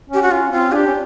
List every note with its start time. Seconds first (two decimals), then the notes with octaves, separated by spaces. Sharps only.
0.09 C#4 G4
0.22 F#4
0.31 C#4 F4
0.51 C4 F4
0.72 D4 G4 G#4
0.87 C#4